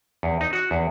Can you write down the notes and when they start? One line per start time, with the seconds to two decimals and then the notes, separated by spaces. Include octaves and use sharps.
0.23 E2
0.41 D#4
0.53 F#4
0.71 E2